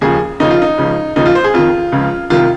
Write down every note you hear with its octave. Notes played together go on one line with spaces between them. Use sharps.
D#2 C#3 F3 G#4
D#2 C#3 F3 D#4
F4
D#4
C#2 C#3 F3
D#2 C#3 F3 D#4
F4
C5
G#4
F2 D#3 F4
C#2 C#3 F3
C2 C3 D#3 F4